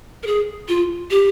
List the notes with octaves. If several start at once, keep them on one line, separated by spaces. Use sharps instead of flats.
A#4
G#4
F4
G4